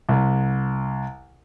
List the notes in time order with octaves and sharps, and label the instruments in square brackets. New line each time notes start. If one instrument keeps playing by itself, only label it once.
[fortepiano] C2